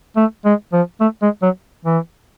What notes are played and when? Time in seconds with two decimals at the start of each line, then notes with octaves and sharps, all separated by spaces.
0.16 A3
0.45 G#3
0.73 F3
1.01 A3
1.22 G#3
1.43 F#3
1.85 E3